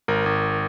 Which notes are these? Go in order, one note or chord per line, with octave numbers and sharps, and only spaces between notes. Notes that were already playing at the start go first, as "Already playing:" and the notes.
G#1 A#4
G#1